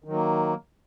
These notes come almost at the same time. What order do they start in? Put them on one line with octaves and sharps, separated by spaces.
D#3 F#3 A#3